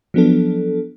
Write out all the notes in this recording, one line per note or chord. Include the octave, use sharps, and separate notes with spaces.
F3 F#3 B3 D4 A4